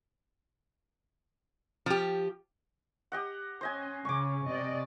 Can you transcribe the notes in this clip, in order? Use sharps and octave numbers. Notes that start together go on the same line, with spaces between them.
F3 G4
G4 D#5 F#5
C#4 C5 D#5 G#5
C#3 C#4 C#6 D6
C3 D5 D#5